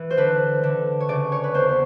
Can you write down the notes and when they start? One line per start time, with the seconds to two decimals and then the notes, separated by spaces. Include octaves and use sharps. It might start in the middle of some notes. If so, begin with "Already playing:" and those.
Already playing: E3
0.10 C5
0.17 D3 B4
0.63 D3
1.00 C#5
1.09 C#3 D5
1.32 C#5
1.44 B4
1.54 E2 C5
1.69 C5